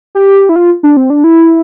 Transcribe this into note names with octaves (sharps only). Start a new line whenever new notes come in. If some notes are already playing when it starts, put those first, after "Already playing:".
G4
E4
F4
D4
C4
D4
E4